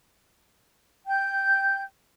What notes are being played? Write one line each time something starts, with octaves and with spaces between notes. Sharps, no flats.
G5 G6